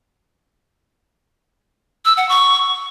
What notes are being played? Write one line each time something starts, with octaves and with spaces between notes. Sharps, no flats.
E6
F#5
C#6